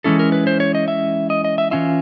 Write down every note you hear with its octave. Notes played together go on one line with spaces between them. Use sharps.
E3 G#3 C#4 E4 A4
A#4
B4
C5
C#5
D#5
E5
D#5
D#5
E5
E3 G#3 C#4 F4 E5